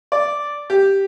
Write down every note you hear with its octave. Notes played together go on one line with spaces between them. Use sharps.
D5
G4